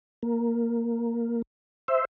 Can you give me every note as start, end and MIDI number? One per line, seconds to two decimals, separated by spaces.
0.23 1.42 58
1.88 2.05 72
1.88 2.05 76